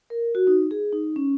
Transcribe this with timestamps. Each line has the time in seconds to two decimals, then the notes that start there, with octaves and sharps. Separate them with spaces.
0.10 A#4
0.35 F#4
0.47 D#4
0.71 G#4
0.92 D#4
1.16 C#4